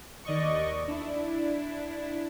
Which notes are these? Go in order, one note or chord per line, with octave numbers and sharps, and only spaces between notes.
D#2 D5 D#5 C#6
D4 E4